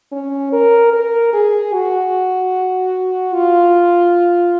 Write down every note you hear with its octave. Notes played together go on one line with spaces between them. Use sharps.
C#4
A#4
A#4
G#4
F#4
F4